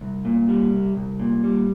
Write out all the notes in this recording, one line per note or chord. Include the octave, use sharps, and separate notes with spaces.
C2
A#2
G3
C2
C2
A#2
G3